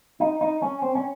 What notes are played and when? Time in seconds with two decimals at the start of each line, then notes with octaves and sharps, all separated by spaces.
0.20 D#4
0.41 D#4
0.62 C#4
0.82 C4
0.95 C#4